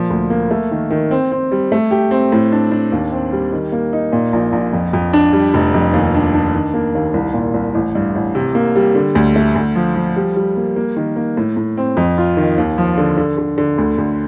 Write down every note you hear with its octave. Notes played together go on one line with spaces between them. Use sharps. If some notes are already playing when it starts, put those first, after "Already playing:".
Already playing: A#2 F3
D2
A#3
A3
D#3
D#3
C4
C4
G3
A3
G4
C4
A2
D4
D4
D#2
C4
G3
D#3
A#3
D#4
A#2
A#1
A#1
F2
F2
D4
G3
F1
F2
D#2
D4
D4
D#3
A#3
D#2
C2
A#2
C2
A1
G2
A1
C3
A#3
G3
D3
D2
A3
D2
F3
F3
G3
G3
A#3
A#3
D#3
A#3
A2
A2
C4
F2
F4
D#3
D#2
F3
D3
D3
D3
D3
D2
D2